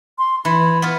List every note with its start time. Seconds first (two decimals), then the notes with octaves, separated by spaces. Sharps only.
0.18 C6
0.45 E3 B5
0.82 B3 F4